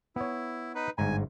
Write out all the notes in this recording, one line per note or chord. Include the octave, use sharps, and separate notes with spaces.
B3 E4 C#5
D#4 B4
G1 G#2 G#5 A#5